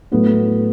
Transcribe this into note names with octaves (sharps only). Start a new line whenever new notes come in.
A2 F#3 A3 B3